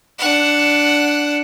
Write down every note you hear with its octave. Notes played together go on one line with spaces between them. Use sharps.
D4 F#5